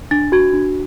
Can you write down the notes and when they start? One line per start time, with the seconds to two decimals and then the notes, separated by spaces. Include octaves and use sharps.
0.11 D4 A6
0.32 F#4 G#6
0.53 D4